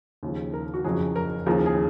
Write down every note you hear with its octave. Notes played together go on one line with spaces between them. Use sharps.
D#2 C#3 F3
A#4
F#4
F#1 F2 C#3 F#3 G#4
A#4
D#2 C#3 F3 A#4
G#4